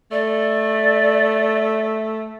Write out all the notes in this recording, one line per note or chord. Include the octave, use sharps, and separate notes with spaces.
A3 D5